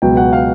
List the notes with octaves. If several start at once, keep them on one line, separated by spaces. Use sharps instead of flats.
C#2 B2 F#3 G5
F#5
F5